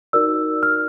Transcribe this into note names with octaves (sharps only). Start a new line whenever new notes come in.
D#4 F#4 A#4 D5 E6
F6